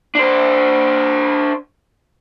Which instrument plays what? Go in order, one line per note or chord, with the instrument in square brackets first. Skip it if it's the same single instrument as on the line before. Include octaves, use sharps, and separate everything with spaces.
[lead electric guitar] D4 C5